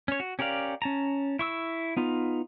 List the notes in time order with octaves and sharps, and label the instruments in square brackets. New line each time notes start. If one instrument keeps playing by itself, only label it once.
[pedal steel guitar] C#4 C#5
F#4
C#4 G4 A#4 D5 F5
C#4 A5 A#5
E4 C#6 E6
B3 D#4 F4